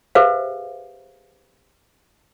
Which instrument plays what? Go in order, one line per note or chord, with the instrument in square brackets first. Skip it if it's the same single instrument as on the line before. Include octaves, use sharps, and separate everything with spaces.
[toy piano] G4 G#4 B4 C5 E5 F5